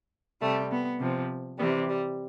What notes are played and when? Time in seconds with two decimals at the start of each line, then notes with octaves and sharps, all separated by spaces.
0.41 C3 G3 A3
0.71 B3
1.00 C3 F3
1.59 C3 E3 G3 B3
1.89 G3